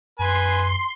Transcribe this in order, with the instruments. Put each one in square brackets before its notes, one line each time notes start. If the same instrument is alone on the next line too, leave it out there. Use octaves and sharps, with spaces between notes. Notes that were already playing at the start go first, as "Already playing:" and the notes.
[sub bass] F#2 [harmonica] B4 G#5 [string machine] C6